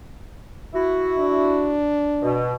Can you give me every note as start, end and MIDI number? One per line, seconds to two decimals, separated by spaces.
0.74 1.77 64
0.74 1.77 66
1.18 2.44 62
2.22 2.53 47